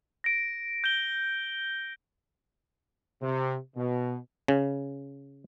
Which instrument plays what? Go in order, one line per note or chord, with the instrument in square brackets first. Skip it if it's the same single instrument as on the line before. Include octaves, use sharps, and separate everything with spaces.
[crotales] A#6 D7
G6 D7 G7
[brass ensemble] C3
B2
[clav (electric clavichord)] C#3